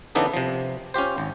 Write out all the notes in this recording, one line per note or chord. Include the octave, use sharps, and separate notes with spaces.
C#3 E3 B3 D4 D#4 A4
C3 F3
C#4 F4 G4 C5
G#1